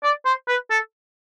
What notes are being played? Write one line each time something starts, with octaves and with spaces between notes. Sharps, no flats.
D5
C5
B4
A4